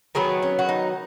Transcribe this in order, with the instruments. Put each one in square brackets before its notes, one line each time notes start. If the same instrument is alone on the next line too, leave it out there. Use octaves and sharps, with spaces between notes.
[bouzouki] D#3 F#3 B3 G#4
C#4
F#4
D#4